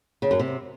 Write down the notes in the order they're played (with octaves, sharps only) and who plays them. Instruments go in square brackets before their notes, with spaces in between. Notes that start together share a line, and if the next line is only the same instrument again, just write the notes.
[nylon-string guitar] C#3
F#2
C3